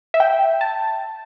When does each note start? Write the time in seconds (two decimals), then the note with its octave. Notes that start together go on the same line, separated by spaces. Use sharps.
0.14 E5
0.20 G5
0.61 A5